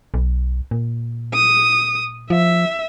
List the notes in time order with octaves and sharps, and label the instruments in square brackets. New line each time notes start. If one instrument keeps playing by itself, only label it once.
[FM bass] B1
A#2
[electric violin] D#6
[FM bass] F3 [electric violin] E5